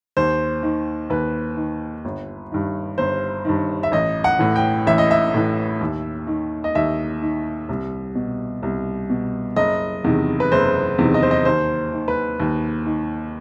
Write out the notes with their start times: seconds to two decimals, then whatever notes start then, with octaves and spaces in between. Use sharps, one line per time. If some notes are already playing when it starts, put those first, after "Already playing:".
0.17 D#2 C5
0.63 D#3
1.10 D#2 B4
1.57 D#3
2.05 G1
2.52 G2 D#3
2.98 G1 C5
3.45 G2 D#3
3.83 E5
3.92 A1 D#5
4.24 F#5
4.39 A2 E3
4.56 G5
4.87 A1 E5
4.98 D#5
5.11 E5
5.34 A2 E3
5.81 D#2
6.27 D#3
6.64 D#5
6.75 D#2 E5
7.22 D#3
7.69 C2
8.15 B2
8.63 C2
9.10 B2
9.56 F#1 D#5
10.04 E2 C3 D#3
10.40 B4
10.52 F#1 C5
10.98 E2 C3 D#3
11.14 D#5
11.23 C5
11.31 D#5
11.45 D#2 C5
11.93 D#3
12.08 B4
12.40 D#2
12.86 D#3